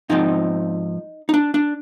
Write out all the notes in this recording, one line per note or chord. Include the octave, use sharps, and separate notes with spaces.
G#2 F3 C4 D#4
D#4
D4
D4